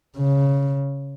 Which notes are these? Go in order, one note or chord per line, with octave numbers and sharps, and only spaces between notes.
C#3